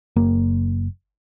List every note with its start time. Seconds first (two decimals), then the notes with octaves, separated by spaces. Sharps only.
0.16 F#1 A#3